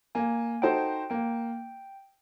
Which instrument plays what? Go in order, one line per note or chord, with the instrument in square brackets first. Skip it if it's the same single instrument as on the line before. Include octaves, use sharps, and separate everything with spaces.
[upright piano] A#3 [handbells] G#5
[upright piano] D#4 F#4 A4 C5 [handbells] G5
[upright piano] A#3 [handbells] G5